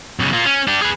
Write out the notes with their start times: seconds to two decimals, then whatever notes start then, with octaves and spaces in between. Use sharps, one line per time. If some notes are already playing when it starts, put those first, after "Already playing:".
0.20 B1 C#3
0.33 A#3 F4
0.45 C#4
0.68 D4 G4
0.82 G#4 B4